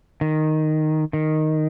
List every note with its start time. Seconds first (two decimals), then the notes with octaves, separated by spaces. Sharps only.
0.21 D#3
1.13 D#3